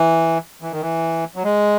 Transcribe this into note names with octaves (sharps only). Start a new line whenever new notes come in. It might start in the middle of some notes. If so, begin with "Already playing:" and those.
Already playing: E3
E3
D#3
E3
F#3
G#3